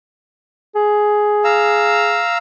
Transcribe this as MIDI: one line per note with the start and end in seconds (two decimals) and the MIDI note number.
0.76 2.22 68
1.44 2.38 77
1.44 2.38 82
1.44 2.38 88